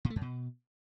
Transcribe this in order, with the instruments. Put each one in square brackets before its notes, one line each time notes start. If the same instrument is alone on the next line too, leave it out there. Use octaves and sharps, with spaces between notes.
[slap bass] A#2
A3
F#2
B2